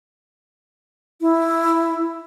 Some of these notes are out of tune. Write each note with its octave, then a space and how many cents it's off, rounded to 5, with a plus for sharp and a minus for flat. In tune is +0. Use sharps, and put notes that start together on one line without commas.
E4 +5